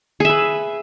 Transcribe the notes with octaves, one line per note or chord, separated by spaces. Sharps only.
G#4 B4 E5